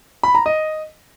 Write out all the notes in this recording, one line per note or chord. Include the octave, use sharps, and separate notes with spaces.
B5
A#5
D#5